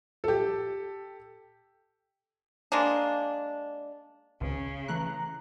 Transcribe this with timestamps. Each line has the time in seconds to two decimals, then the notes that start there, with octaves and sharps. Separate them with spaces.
0.24 G4 A4
2.72 G#3 A#3 D4
4.41 G#1 C#2 C#3
4.88 E3 A3 A#5 F#6